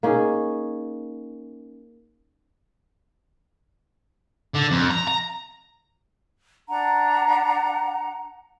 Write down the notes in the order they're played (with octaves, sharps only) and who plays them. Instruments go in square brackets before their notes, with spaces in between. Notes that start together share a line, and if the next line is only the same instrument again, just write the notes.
[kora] A#3 C#4 D#4 G#4
[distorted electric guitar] D3
F2
A#5
A#5
[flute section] D4 F#5 A#5